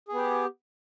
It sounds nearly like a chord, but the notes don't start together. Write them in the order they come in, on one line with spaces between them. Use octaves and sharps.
G#4 B3 G4